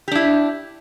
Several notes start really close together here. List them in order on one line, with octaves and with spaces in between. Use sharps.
G4 D4 E4